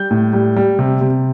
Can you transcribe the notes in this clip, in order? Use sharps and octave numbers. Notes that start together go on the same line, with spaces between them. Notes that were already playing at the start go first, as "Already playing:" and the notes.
Already playing: G3 G6
A2
G3
G3
C3
C3